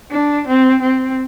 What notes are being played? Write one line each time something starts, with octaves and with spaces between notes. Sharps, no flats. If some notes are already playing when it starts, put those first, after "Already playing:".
D4
C4
C4